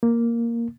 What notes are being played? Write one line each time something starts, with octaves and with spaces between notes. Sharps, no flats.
A#3